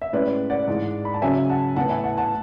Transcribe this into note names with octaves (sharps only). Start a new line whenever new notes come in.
E5
A2 G#3 C#4 B4 D5
D5 F#5
G#2 E3 G#3
B5
A5
C#3 F#3 C#4 E5 G#5
F#5 A5
A2 E3 B3 F#5 A5
E5 G#5
F#5 A5
F#5 A5